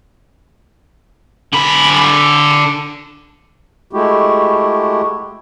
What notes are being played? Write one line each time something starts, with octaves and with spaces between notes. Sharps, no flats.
D3 B5
G#3 A3 E4 F#4 G4